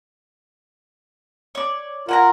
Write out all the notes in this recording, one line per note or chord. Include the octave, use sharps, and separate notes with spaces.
C#5 D5
F4 A#4 F#5 G#5 A#5